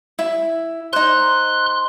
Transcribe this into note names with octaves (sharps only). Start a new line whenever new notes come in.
E4
D#4 C5 C6 F#6